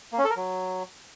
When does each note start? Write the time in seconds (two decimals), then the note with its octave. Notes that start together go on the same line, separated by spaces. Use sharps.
0.13 A#3
0.19 C#4
0.24 A4
0.30 A#4
0.36 F#3